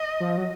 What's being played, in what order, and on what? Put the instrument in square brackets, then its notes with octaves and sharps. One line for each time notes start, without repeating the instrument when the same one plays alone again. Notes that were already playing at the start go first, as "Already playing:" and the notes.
Already playing: [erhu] D#5
[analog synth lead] F3
F#3